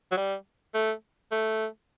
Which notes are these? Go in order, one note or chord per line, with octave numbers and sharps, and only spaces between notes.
F#3
G3
A3
A3